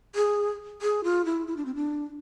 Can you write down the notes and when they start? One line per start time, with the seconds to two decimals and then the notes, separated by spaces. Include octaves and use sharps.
0.15 G#4
0.82 G#4
1.04 F4
1.25 E4
1.47 E4
1.57 D4
1.65 C4
1.75 D4